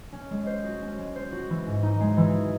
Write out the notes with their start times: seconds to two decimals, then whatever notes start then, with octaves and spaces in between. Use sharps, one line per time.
0.12 C#4
0.30 G#3
0.47 C5
0.64 F#4
0.82 C#4
0.98 G#3
1.16 C5
1.32 F#4
1.50 E3
1.67 G#2
1.83 D#4
2.00 G#3
2.17 E3